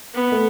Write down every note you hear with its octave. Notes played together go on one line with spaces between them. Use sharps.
B3
A3